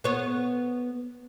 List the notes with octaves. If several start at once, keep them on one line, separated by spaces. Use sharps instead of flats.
B3 C#5